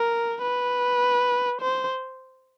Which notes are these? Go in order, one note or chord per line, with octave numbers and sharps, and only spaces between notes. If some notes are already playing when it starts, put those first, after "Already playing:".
Already playing: A#4
B4
C5